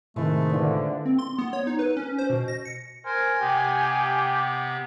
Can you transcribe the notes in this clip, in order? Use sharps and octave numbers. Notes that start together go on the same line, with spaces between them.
A2 C3 D#3 G#3 A3 E4 C5
D3 E3 F4
C4
C6
B3
C#5
D#4
B4
C#4
C5
B2
A#6
C#7
A#4 C5 G#5
C3 B3 G4 G5